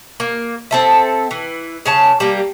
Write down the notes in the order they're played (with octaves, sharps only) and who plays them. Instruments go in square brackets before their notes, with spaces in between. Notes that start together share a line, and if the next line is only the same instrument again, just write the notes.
[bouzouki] A#3
C4 A4 E5
E3
C#3 C#4 A5
G3 A#3